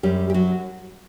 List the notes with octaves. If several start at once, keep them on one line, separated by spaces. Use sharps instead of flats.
F#2 G3 G4
G4
F#3 F#4